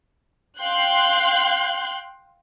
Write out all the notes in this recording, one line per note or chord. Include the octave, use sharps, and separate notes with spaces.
F5 G5 C6 F#6 G6